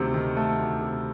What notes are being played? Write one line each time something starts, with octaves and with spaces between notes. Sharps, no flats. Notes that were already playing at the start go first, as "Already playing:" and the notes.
Already playing: D2 C3 D#3 A3
D#3
A3
D2
C3